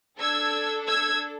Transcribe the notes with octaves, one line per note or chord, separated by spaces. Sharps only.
D4 A4 E6 G#6
E6 G#6